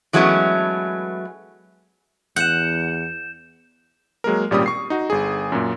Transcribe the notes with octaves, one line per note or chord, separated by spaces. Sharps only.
E3 F#3 G#3 A3 B3 C#4
E2 F#5 G6 E7
F#3 G#3 A#3 A#4
G#1 A#2 G3 C#4 G4 D#6
C#6 C7
D#4 F#4
G1 G#4
F#2 A#2